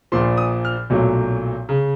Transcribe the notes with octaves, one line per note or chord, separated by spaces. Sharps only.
A#1 A#2 F3 C6
D#6
F6
B1 A#2 F#3 A3
C#3